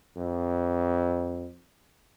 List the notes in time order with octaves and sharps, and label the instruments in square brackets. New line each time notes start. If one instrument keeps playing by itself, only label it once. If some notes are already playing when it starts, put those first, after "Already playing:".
[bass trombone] F2